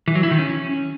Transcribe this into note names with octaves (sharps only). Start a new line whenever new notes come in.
E3
F#3
E4
D#3
C#4